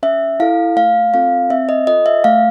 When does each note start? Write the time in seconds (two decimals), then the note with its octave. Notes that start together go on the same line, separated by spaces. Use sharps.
0.03 C#4 E5
0.40 E4 A4 F5
0.76 A3 F5
1.14 C4 F4 A4 F5
1.50 C4 E5
1.69 D#5
1.87 F4 A4 D#5
2.06 E5
2.24 A3 F5